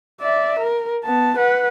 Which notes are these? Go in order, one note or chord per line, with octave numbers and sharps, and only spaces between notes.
D5 E5
A#4
B3 A5
B4 F#5